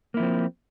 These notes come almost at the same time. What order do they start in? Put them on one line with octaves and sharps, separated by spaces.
A#3 E4 F3 C4